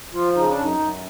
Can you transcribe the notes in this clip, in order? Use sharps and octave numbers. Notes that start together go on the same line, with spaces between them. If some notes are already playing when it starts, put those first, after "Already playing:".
F3 F4
C#3 D#4
D4
F#2 D#4
F#2